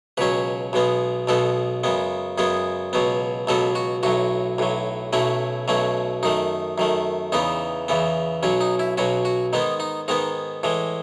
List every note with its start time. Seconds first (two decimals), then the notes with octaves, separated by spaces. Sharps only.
0.17 C#2 B2 F#3 C#4 B4
0.73 B1 B2 G#3 B3
1.27 B1 B2 G#3 B3 A4
1.84 F#2 C#3 G#3 B3
2.38 F#2 C#3 G#3 B3 G#4
2.93 C#2 B2 F#3 B3
3.47 C#2 B2 F#3 B3 A4
3.75 F#4
4.03 B1 A2 F#3 F#4
4.58 B1 A2 F#3
5.13 B1 B2 F#3 A3 C#4 E4
5.68 B1 B2 F#3 A3 C#4
6.23 F#2 D#3 A3 D#4
6.78 F#2 D#3 A3
7.32 E2 C#3 E3 B3 D#4
7.88 E2 C#3 E3 B3
8.43 B1 B2 F#3 C#4
8.61 D#4
8.79 E4
8.98 B1 B2 F#3 C#4 F#4
9.25 F#4
9.53 G#2 D#3 G#3 B3 D#4
9.80 D#4
10.08 G#2 D#3 G#3 B3 D#4
10.63 A2 E3 G#3